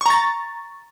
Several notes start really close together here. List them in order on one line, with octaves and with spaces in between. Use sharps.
C#6 A#5 A6